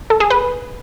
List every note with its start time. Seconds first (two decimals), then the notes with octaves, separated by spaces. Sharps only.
0.10 A4
0.20 G#4
0.30 B4